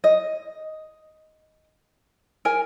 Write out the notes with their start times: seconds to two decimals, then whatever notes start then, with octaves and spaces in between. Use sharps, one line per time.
0.04 D#5
2.45 A#4 G#5